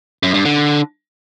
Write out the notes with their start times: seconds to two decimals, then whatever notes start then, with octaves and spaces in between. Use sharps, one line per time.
0.23 F#2
0.34 G2
0.45 D3